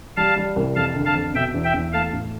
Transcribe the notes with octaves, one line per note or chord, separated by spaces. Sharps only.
G3 F5 A5
G3
C2
F2 F5 A5
D3
F5 A5
F2
B2 E5 G5
E2
E5 G5
E2
A3 F5 A5
A2